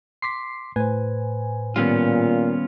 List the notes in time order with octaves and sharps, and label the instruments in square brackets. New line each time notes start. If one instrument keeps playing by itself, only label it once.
[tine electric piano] C6 D6 B6 [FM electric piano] C7
[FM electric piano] A2 G#5 [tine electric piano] B4 C5
[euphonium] A#2 [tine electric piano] D#3 G3 [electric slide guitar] B3 C#4 F4